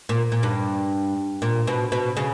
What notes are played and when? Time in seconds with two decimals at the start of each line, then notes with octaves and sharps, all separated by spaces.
0.09 A#2
0.32 A#2
0.43 G2
1.42 A#2
1.67 B2
1.92 B2
2.17 C#3